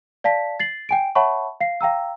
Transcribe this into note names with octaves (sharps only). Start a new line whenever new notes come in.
D5 F5 A5 B6
A6 C7 F#7
G5 G#5 D7
C#5 E5 F#5 A5 B5 C#6
F5 C7
F5 G5 A#5 E6